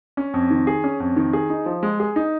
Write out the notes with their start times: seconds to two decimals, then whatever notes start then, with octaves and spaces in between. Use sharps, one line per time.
0.17 C#4
0.34 F2
0.51 D#3
0.67 G#4
0.84 C#4
1.00 F2
1.16 D#3
1.33 G#4
1.50 D#4
1.66 F3
1.83 G#3
2.00 G#4
2.16 D#4